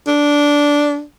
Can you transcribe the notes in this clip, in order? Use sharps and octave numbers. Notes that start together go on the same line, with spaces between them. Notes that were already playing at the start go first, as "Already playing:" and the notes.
D4